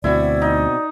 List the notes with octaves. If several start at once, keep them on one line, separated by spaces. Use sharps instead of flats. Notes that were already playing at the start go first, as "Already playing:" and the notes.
D2 B2 C4 E4 F#4 D5
D#4